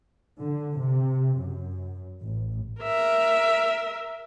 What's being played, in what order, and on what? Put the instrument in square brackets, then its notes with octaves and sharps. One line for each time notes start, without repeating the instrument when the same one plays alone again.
[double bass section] D3
C3
F#2
A1
[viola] A#4 E5